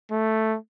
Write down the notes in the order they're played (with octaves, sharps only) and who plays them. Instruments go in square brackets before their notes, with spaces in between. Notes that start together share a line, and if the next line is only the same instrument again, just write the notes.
[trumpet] A3